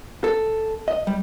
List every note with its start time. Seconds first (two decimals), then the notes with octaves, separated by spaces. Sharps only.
0.24 A4
0.88 D#5
1.07 G3